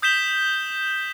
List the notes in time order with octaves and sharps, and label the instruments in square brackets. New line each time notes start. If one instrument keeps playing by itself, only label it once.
[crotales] D#6 G6 B6 E7 G7